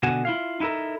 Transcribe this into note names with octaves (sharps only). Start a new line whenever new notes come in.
B2 D3 F#4 F#5 G#5
E4 F4 F5
D#4 E4 F#4 A4 A#4